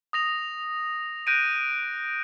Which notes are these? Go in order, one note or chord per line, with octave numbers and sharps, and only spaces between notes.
D#6 A#6 F7
F#6 G6 A#6 D7 D#7